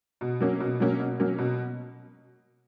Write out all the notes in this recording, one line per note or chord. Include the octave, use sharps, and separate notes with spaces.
B2
F#3 A#3 C#4
B2
F#3 A#3 C#4
B2
F#3 A#3 C#4
B2